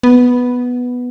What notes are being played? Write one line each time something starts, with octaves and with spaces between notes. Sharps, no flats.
B3